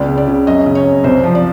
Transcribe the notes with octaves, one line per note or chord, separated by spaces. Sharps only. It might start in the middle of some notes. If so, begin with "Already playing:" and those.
Already playing: C#2 D5
C#3
D5
C#3
F#2 D#5
C#3
C#5
F#2
C2 C5
F3
D5